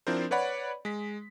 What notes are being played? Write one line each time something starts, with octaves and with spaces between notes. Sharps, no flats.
F3 C4 D4 E4 A#4 C5
B4 C#5 D5 F#5 B5
G#3 B6